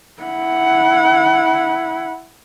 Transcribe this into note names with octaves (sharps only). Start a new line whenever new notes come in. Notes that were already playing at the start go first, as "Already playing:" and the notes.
E4 F#5